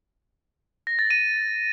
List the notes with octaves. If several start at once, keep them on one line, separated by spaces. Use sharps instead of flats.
A#6
A6
D#7